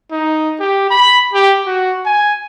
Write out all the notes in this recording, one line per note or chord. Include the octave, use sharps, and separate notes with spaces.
D#4
G4
B5
G4
F#4
G#5